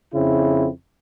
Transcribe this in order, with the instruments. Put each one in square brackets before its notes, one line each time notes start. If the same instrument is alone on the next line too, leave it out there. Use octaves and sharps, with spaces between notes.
[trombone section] F2 C#3 C4 E4